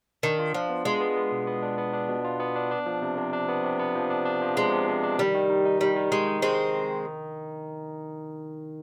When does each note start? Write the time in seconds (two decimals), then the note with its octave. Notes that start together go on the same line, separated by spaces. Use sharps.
0.23 D#3 D4
0.39 F4
0.54 F3 D4
0.69 B3
0.85 G#3 F4
1.01 B3
1.16 B3
1.32 B2
1.47 B3
1.63 D4
1.78 B3
1.93 D4
2.09 B2
2.24 F4
2.40 B3
2.56 D4
2.71 D4
2.86 F3
3.02 C3
3.18 C3
3.33 D4
3.48 B3
3.64 C3
3.79 B3
3.95 F3
4.10 D4
4.26 D4
4.41 F3
4.57 C3 G#3
4.72 C3
4.88 C3
5.03 D4
5.19 D#3 G3
5.35 D#3
5.50 D#4
5.65 D#4
5.81 D#3 G3
5.96 D#3
6.12 G#3 D#4
6.27 D#4
6.42 D#3 G#3 C4